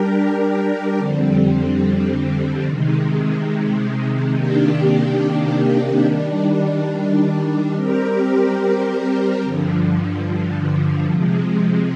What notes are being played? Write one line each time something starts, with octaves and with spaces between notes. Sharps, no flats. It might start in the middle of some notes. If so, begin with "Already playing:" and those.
Already playing: G3 D4 G4 A#4
F2 D3 G3 C4
C3 D#3 G#3
C3 D#3 A#3 D4 G4
D#3 G3 D4
G3 C4 G4 A#4
G2 D3 F3
C3 F3 G#3